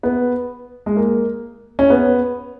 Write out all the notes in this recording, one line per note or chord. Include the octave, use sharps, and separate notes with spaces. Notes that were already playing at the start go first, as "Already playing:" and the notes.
B3
G#3
A#3
C#4
B3